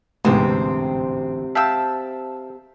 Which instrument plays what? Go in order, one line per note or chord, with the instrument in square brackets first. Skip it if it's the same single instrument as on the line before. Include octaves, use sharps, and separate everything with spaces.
[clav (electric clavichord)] A1 D2 [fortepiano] G#2 B3 [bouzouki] C3 C4
[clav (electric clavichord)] E5 F5 G5 [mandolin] A5 E6